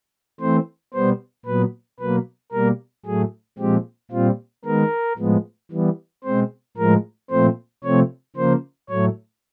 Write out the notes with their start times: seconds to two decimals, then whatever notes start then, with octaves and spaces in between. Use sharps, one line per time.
0.40 E3 A3 C4 C5
0.94 B2 G3 B3 C5
1.46 A#2 F#3 B3 B4
2.00 B2 F#3 A#3 B4
2.52 B2 G3 A#3 A#4
3.06 A2 F#3 A3 G#4
3.58 A#2 F3 G#3 C4 G4
4.11 A#2 G3 C4 F4
4.65 D#3 G#3 B3 A#4
5.18 A2 F3 G#3 B3
5.71 E3 G3 B3
6.24 B2 G#3 C4 C5
6.77 A2 F3 G#3 A#4
7.30 A#2 F3 A3 C4 C5
7.84 C3 F3 A3 C4 C#5
8.36 C#3 F3 A#3 C5
8.89 A2 F#3 A3 C#5